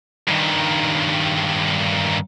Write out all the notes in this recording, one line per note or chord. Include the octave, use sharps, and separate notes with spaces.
G2 D#3